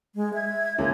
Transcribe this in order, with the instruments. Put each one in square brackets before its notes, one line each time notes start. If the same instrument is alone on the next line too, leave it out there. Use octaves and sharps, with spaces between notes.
[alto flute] G#3
[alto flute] E5 [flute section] G#6
[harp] C#2 [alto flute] A#3